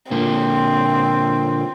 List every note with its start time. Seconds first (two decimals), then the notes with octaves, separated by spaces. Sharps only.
0.11 A#2 D3 A#3 C4